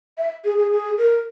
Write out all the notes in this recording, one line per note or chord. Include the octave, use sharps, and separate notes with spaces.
E5
G#4
G#4
G#4
A#4